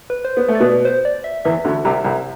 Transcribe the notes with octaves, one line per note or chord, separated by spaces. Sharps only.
B4
C5
B3
A3
D5
B2 B3
C5
D5
E5
E2 E3 E5
D2 D3
C2 C3
C2 C3